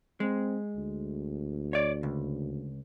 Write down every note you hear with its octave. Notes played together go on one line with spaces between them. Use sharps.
G#3 C4
D2
C#5 D5
C#2